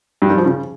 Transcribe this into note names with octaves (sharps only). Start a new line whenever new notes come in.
G2
G3
F3
C#3